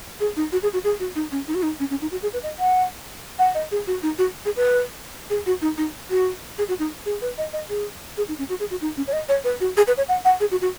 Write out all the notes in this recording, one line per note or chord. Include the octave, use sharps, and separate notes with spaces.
G#4
D#4
F#4
G#4
F#4
G#4
F#4
D#4
C#4
D#4
F#4
D#4
C#4
C#4
D#4
F#4
G#4
B4
D#5
F#5
F#5
D#5
G#4
F#4
D#4
F#4
G#4
B4
G#4
F#4
D#4
D#4
F#4
G#4
F#4
D#4
G#4
B4
D#5
D#5
G#4
G#4
D#4
C#4
F#4
G#4
F#4
D#4
C#4
C#5
D#5
C#5
B4
F#4
G#4
B4
C#5
F#5
F#5
G#4
F#4
F#4